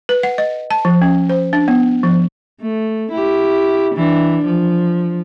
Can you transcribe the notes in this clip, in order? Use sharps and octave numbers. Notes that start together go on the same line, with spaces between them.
B4
F#5
D#5
A5
F3
C#4
C5
D4
B3
F3
A3
E4 G4
E3 D4
F3